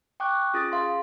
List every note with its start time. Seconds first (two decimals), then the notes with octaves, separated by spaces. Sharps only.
0.20 G5 C#6 D6 F#6
0.54 C#4 F4 G#4 D#6 A6 A#6
0.72 G#4 F5 C6